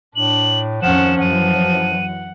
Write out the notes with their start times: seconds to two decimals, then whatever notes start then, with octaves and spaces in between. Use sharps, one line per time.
0.16 A2 D4 F#7
0.83 F2 D#3 F3 C#4 F#5 E7
1.21 F#2 E3 F#5 D#7